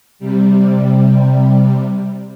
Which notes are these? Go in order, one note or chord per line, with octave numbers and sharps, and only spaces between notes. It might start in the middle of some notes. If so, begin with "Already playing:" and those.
C3 G3